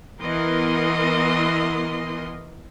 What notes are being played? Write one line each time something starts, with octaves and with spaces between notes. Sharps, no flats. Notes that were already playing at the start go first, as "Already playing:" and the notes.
E3 B3 A#4 D#5 C6